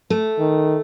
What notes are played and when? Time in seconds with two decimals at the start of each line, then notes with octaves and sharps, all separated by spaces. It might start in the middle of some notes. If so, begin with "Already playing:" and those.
0.10 A3
0.39 D#3